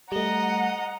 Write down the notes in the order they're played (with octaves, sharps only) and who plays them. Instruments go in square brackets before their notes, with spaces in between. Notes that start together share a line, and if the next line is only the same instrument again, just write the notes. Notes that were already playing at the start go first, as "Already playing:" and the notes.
[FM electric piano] G3 A3 [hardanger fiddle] D#5 [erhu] F#5 [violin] A#5